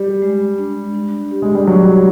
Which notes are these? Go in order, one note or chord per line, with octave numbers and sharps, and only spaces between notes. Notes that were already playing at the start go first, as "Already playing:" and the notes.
Already playing: G3 G4
G#3
D4
D4
G4
G#3
G3
F#3 G4